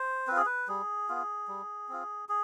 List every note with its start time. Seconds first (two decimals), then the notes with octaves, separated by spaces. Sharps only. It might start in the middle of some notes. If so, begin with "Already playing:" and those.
Already playing: C5
0.27 C4 F4 B4
0.37 G#4
0.46 B4
0.68 G3 G#4
1.09 B3 F4
1.48 G3
1.89 C4 F4
2.29 G#4